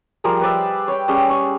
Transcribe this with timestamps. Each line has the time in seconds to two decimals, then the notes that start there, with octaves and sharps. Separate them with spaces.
0.24 F3 G3 G#4 A#4
0.41 B4 C5 D5 E5
0.88 C#5 G5
1.08 G3 C#4 G#4
1.30 C#6